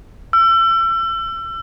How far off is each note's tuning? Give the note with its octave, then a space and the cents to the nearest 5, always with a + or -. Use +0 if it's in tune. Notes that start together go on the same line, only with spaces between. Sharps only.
E6 +35